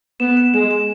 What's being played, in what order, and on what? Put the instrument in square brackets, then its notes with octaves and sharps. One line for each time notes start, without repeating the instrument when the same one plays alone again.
[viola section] B3 [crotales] E7
[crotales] E7
[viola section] G#3 [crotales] E7
[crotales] E7